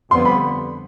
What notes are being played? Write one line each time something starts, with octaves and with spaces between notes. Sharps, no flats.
F2 D3 G3 B3 C6
B5